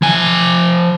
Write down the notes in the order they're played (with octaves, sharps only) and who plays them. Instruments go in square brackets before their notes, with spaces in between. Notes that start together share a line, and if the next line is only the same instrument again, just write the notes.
[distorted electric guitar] F3 G#5